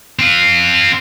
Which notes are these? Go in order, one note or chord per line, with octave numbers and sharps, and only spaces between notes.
C4 F4